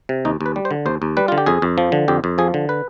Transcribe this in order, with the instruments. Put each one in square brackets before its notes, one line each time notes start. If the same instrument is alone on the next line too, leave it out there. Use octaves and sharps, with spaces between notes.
[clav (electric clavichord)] C3
D#2 D#4
D#2
B4
G3
C5
D3
D#2 C5
D#2
G3 B4
D3 F4
G4
F2 G#4
F2
F3
D3
F2 G4
F2
F3 G#4
D3
B4